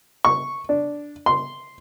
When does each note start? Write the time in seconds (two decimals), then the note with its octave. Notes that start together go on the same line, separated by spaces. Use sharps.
0.25 C#6
0.69 D4
1.26 C6